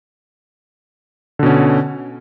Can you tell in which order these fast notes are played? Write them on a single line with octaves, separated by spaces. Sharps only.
D3 B2 C#4